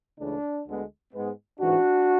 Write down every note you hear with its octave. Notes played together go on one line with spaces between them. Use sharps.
C#2 C#3 E3 A3 D4
D2 D3 G#3 B3
G#2 G#3 B3
A1 G#2 E3 D4 F#4